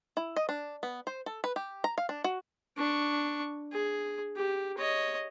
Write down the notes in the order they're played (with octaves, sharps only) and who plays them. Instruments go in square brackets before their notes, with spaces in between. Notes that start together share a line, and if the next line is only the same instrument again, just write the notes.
[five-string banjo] E4
D#5
D4
B3
C5
A4
B4
G4
A#5
F5
D4
F#4
[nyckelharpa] D4 C#6
G#4
G4
C#5 D#5